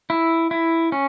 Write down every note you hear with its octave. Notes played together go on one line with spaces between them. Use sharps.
E4
E4
C#4